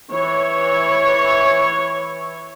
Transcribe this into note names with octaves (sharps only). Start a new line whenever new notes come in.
E3 C#5